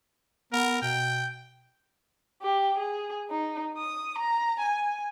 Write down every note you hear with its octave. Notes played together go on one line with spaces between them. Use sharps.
B3 A#4
B2 G5
G4
G#4
D#4
D#6
A#5
G#5